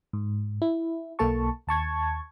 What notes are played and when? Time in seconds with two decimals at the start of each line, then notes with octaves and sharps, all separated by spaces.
0.13 G#2
0.62 E4
1.19 B1 A#3 A4 A5 C#6
1.67 D#2 A5 C#6 G#6